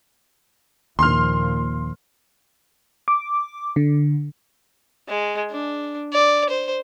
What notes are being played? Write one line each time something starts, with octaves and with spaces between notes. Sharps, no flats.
D#2 A#2 F3 C6 F6
D6
D3
G#3
D4
D5
C5